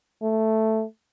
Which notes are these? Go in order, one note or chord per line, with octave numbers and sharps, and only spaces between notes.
A3